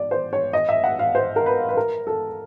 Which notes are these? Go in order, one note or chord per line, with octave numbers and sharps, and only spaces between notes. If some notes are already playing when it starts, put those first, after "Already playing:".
Already playing: D5
C5
C#5
D#5
E5
F#5
F5
C5
A#4
B4
B4
A#4
A4